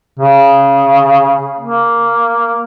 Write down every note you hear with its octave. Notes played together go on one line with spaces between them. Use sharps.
C#3
A#3